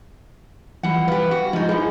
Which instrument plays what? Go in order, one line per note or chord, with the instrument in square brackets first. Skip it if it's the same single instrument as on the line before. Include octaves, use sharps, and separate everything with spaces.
[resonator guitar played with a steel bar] B2 F#5 [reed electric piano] E3 F3 G3
[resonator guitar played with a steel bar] B3 G4 [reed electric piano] B4 F5
[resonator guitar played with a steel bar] F#4
[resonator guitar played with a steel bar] G#2 D#4 [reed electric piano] F3 G#3
[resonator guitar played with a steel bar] B2 F3 [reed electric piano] E4 G#4